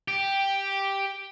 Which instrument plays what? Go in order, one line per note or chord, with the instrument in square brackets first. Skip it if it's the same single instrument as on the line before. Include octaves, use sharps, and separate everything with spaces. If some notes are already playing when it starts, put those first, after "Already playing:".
[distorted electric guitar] G4